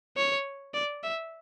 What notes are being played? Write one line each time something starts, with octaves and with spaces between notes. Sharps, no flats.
C#5
D5
E5